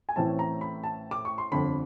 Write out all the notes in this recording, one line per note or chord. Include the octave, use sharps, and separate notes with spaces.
G#5
A1 A2 E3 A3 C4 A5
A#5
B5
A5
D6
C#6
C6
G1 F2 D3 B5